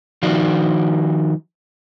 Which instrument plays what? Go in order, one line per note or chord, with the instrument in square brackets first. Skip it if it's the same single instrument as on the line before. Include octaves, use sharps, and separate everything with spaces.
[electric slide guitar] D#3 F3 D#4 F#4 D5 F5